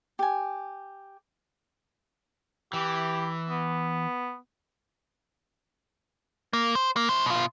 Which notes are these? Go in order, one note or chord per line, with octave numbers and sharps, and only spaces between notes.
G4 G#5
E3 G4
B3
A#3
C5
A#3
E4 C5
B2 F4